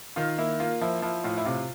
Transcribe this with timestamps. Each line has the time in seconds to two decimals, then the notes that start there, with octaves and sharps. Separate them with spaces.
0.16 D#3 F4
0.38 A#3 E4
0.60 A#3 F4
0.81 F3 E4
1.02 F3 E4
1.24 A2 F4
1.38 E4
1.45 C3 F4